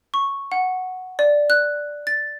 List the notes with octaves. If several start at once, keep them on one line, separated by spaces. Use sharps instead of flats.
C#6
F#5
D5
F#6
A6